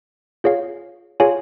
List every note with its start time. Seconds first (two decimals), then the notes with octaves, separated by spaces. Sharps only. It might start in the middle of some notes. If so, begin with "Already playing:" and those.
0.44 F4 G#4 C#5 F5
1.20 F4 G#4 C#5 F5 G#5